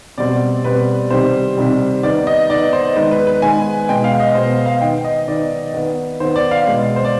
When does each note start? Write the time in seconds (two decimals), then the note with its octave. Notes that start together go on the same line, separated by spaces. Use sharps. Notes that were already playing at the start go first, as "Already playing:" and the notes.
0.18 B2 G3 C4 D5
0.64 B2 G3 C4 B4
1.11 C3 D#3 G3 C5
1.57 C3 D#3 G3
2.03 D#3 B3 D5
2.27 D#5
2.49 D#3 D5
2.54 B3
2.73 C5
2.96 D#3 G#3 B3 B4
3.11 B4
3.27 B4
3.42 D#3 G#3 B3 G#5
3.89 B2 G#3 B3 G5
4.04 F5
4.20 D#5
4.35 B2 G#3 B3 C5
4.66 F5
4.81 D#3 B3 G5
5.04 D#5
5.28 D#3 B3 D5
5.74 D#3 B3
6.20 D#3 C5
6.25 B3
6.36 D5
6.51 F5
6.67 B2 G#3 B3
6.96 C5
7.05 D5